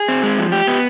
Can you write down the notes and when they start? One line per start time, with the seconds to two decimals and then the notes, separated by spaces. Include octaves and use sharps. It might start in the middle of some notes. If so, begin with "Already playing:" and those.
Already playing: G#4
0.08 C4
0.23 G#3
0.38 F3
0.52 G4
0.67 B3